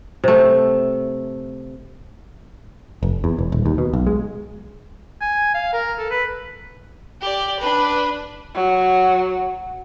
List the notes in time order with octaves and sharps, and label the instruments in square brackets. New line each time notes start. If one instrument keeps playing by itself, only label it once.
[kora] C3 A3
[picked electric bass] F1
E2
E1
D#1
D#2
B2
B1
G#3
[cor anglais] G#5
F5
A#4
A4
B4
[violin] G4 D5
D4 B4
[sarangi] F#3